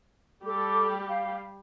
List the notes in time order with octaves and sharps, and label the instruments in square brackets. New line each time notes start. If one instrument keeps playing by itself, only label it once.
[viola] G3 G4 [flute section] A4 D6
[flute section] F5